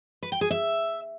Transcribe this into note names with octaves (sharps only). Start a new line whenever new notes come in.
B4
G5
G#4
E5